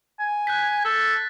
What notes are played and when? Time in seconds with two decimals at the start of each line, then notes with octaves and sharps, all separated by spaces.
0.20 G#5
0.47 F#6 G6 B6
0.85 A4 A6